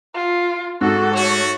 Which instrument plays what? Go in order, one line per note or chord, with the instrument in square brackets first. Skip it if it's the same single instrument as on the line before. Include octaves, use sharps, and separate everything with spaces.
[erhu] F4
[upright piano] G#2 [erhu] F#4 [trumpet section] A4
[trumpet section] A3 F#4 [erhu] C#5